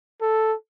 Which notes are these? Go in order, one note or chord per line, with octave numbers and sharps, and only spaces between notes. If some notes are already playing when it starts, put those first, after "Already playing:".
A4